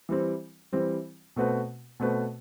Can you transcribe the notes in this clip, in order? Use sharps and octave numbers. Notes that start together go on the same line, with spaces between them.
E3 G3 C4
E3 G3 C4
B2 A3 C4 F#4 B4
B2 A3 C4 F#4 B4